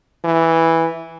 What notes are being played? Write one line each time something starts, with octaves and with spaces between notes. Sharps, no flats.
E3